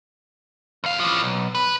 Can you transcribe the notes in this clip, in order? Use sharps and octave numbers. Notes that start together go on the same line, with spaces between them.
E2 F5
E3 F3
B1
B4